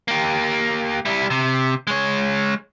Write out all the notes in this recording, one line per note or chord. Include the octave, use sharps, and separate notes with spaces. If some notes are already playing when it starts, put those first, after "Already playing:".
A#3 G4
G3 E4
C3
G#3 C#5